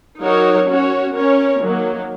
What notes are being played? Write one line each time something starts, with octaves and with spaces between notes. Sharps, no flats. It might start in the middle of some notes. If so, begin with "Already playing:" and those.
F#3 D#4 F#4 A#4 C#5
C#4 F#4 C#5
C#4 A#4 C#5
D#3 F#3 A#3